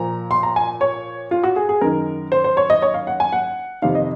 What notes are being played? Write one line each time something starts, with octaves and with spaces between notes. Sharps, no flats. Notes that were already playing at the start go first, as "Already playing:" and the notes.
Already playing: A#2 F3 A#5
C6
A#5
G#5
C#5
F4
F#4
G#4
G#4
F#2 D#3 A#4
C5
C5
C#5
D#5
C#5
F5
F#5
G#5
F#5
F2 C3 D#3 F5
D#5